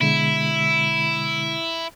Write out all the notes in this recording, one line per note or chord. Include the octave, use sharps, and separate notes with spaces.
B2 D3 G#3 E4